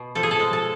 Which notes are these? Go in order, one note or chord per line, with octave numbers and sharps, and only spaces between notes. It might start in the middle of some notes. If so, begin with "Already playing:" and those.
Already playing: B2
F3 A4
G#4
A4
G#3
A4